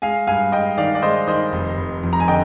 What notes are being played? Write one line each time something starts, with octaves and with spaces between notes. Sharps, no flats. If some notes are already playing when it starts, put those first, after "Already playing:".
G#3 F5 G#5
G2 F5 G#5
G#3 D#5 G5
D#3 D5 F5
D5
G#3 C5 D#5
D#3 C5 D#5
F1
F1
F2
A#5
G#5
D3 D#5 G5